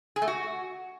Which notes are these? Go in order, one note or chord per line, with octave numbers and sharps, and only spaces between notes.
G#4
A3
F#4